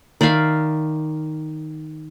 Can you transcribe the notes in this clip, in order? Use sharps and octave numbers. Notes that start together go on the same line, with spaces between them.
D#3 D5 E5 F5